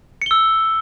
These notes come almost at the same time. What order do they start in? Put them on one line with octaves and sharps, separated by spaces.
C#7 G7 E6